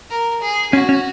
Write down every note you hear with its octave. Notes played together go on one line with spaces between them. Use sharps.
A#4
G#4
C#4 F#4
C#4